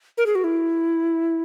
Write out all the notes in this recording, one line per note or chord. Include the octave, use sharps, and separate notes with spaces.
A#4
G#4
F#4
E4